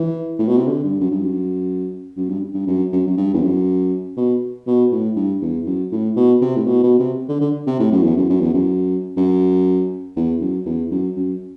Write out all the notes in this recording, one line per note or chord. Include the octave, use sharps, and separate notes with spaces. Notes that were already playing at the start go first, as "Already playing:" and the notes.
Already playing: E3
A2
B2
C3
D3
G2
F#2
G2
F#2
F#2
G2
G2
F#2
F#2
F#2
G2
E2
F#2
B2
B2
A2
G2
E2
F#2
A2
B2
C3
A2
B2
B2
C3
D3
D3
C3
A2
F#2
E2
F#2
F#2
E2
F#2
F#2
E2
F#2
E2
F#2
F#2